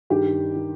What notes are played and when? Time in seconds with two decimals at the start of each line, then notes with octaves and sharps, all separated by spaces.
0.10 G2 D#3 G4
0.56 D#3